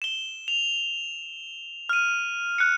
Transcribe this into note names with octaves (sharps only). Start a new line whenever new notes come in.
E7 G7
F7
F6 D#7
F#6 C#7